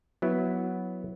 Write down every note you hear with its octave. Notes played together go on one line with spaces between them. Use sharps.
F#3 B3 E4